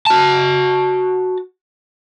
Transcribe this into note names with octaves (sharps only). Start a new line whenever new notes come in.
F#4 A5